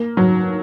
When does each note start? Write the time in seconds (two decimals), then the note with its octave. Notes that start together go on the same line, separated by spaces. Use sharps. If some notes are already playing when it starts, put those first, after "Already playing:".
Already playing: A#3
0.17 F#3